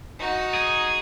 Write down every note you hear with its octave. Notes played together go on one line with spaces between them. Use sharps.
D#4 F#4
G#4